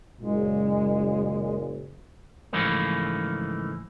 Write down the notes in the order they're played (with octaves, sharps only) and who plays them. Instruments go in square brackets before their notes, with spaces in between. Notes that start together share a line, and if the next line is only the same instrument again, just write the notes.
[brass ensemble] F#1 A#2 [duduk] G#3
[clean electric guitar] G#2 C#3 E3 F3 A3 A#3